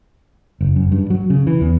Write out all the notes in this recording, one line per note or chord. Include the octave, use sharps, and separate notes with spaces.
F#1
F#2
G2
F#3
C#3
E3
E2